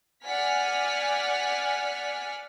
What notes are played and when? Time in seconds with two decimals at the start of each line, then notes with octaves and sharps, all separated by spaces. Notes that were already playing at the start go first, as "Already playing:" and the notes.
0.25 D5 F#5 G#5 F6 B6